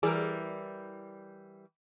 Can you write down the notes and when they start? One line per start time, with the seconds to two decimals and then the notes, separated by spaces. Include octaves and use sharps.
0.03 E3 G3 G#4 A#4 D5